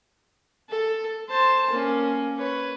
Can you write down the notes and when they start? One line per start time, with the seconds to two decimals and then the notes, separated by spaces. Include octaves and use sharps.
0.69 A4
1.29 C5 A5
1.70 A#3 C#4
2.37 B4 C#5